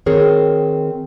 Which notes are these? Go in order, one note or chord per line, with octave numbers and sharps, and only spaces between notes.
D#3 C4 G#4 A#4 C#5